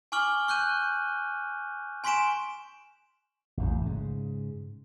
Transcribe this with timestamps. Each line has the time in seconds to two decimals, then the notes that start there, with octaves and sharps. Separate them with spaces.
0.12 G#5 C#6 D6 F6 F#7 G7
0.48 C#6 F#6 G6 D#7
2.04 G#5 C6 C#6 B6 D7 E7
3.57 A1 E2
3.81 G#2 C#3